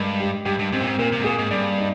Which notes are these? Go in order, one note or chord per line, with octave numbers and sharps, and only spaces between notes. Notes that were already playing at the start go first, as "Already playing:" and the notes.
Already playing: G2 G#3 A#4
G4
G2 G4
G2
G#2 C4
A#2
G#2
A#2 A#3
C3
G#2
A#2 G#4
G#2
G2 D5
D#4